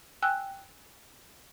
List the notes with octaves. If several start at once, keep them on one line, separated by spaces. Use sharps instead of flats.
G5 G#5 E6 F#6